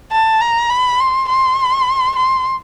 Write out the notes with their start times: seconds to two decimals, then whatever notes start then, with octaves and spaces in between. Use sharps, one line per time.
0.12 A5
0.41 A#5
0.70 B5
0.99 C6
1.29 C6
2.16 C6